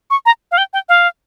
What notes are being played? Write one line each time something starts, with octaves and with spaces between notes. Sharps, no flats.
C#6
A#5
F5
G5
G5
F5